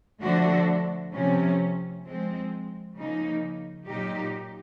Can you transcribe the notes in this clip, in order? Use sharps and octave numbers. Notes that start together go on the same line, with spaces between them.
D3 F3 A3 D4 F#4
C3 F3 A3 C#4
F3 G#3 C4
C#3 F3 A#3 D#4
A#2 F#3 A#3 D#4 G4